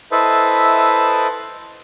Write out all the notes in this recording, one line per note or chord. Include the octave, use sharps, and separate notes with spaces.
E4 A4 B4 C5 D#5 E5